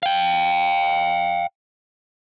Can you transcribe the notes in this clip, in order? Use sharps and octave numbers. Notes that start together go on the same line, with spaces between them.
F5 G5